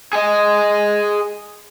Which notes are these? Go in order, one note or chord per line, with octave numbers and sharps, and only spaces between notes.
G#4 D#5